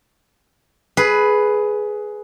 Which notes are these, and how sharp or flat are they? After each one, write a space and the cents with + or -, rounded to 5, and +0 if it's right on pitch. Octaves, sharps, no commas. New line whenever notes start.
G#4 +15 B4 +0